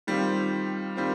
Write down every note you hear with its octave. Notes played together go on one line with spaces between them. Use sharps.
D#3 G3 C4 F4
D#3 G3 C4 F4